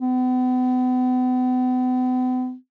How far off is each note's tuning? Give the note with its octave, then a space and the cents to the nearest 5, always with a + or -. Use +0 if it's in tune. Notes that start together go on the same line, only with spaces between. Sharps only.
B3 +40